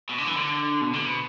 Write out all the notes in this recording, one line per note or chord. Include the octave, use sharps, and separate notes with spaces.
B2
D3
E3
D3
B2
D3
B2